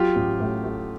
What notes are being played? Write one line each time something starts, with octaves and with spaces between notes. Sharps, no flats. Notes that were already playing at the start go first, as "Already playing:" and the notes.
Already playing: F#3 F4 G4
A1
A2
A3